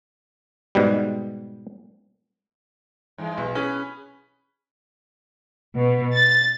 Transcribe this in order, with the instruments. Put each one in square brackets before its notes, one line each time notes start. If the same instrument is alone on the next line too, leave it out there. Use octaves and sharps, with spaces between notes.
[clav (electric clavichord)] G#2 B2 G3
[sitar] G2 E3 G#3
[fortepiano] B1
[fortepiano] C#4 [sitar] G#4 B4
[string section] B2
A6